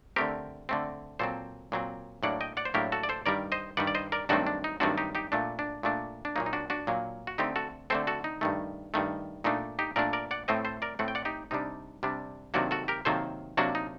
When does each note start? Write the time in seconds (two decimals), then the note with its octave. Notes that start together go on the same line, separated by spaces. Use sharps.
0.16 D3 A3 C4 G4 A#4
0.69 D3 A3 C4
1.19 A#2 F#3 C4 A4 C5
1.72 A#2 F#3 C4
2.23 A2 F#3 A#3 D4 D5 F#5
2.41 D#5 G5
2.57 D5 F#5
2.65 C5
2.74 A2 F#3 A#3 D4 G4 A#4
2.92 F#4 A4
3.03 D5
3.09 A4 C5
3.26 G2 D#3 G3 A#4 D5
3.52 C5 D#5
3.77 G2 D#3 G3 D5 F#5
3.87 D5
3.95 C5 D#5
4.12 A#4 D5
4.29 G2 D#3 F#3 A3 C4 D4 F#4
4.47 D4
4.64 D#4
4.80 G2 D#3 F#3 A3 C4 D4 F#4
4.98 D#4 G4
5.15 D#4 G4
5.32 A#2 A3 D4
5.59 D4
5.83 A#2 A3 D4
6.25 D4
6.36 A#2 F#3 A#3 D#4
6.46 D#4
6.53 D4 F#4
6.70 D4 F#4
6.87 A#2 F#3 A#3
7.27 F#4
7.38 D3 A3 C4 D#4 G4
7.56 F#4 A4
7.90 D3 A3 C4 A4 C5
8.07 F#4 A4
8.24 D#4
8.41 G2 D#3 A3
8.94 G2 D#3 A3
9.44 A#2 A3 D4 D#4
9.79 D#4 G4
9.96 A#2 A3 D4 A#4 D5
10.13 A#4 D5
10.31 D5 F#5
10.48 A2 A3 C4 C5 D#5
10.65 A4 C5
10.82 A#4 D5
10.99 A2 A3 C4 F#5
11.08 G5
11.15 D5 F#5
11.25 D#4 G4
11.51 C3 G3 D4 D#4
12.03 C3 G3 D4
12.54 C3 D#3 F#3 A#3 D4 F#4
12.71 F#4 A4
12.88 G4 A#4
13.05 C3 D#3 F#3 A#3 A4 C5
13.57 C3 F#3 A#3 D4 F#4
13.75 D#4